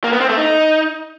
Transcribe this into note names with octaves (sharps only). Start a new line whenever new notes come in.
A#3
B3
C4
A3
D#4